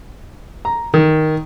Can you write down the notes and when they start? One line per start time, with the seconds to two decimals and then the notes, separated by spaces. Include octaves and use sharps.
0.65 A#5
0.94 D#3